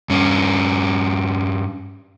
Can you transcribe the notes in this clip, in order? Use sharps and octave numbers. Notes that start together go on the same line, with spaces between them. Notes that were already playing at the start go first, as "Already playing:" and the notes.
G2 C#4